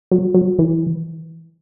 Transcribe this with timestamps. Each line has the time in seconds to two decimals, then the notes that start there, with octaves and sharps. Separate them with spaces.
0.11 F#3
0.34 F#3
0.59 E3